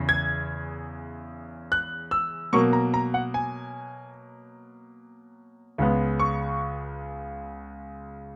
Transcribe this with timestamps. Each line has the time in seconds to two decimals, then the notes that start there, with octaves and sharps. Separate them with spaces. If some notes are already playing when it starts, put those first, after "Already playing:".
Already playing: E2 C#3
0.09 G#6
1.72 F#6
2.11 E6
2.53 B2 F#3 A#3 C#6
2.73 A#5
2.94 A#5
3.14 F#5
3.34 G#5
5.78 C#2 C#3 G#3 B3
6.19 C#6